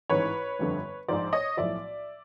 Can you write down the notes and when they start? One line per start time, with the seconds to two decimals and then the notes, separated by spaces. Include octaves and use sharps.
0.10 A1 G#2 E3 B4 C#5
0.59 G1 F2 D3
1.08 A#1 G#2 F3 C5 D5
1.33 C#5 D#5
1.57 B1 A2 F3 D5 E5